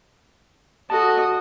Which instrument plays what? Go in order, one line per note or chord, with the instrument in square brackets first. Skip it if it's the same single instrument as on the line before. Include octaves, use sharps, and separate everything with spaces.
[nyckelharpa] F#4 D#5 [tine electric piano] A4 A5